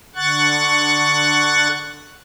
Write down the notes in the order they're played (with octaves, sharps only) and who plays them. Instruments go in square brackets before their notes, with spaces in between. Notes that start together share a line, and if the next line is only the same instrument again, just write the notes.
[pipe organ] D3 F#5 C#6 F#6 A6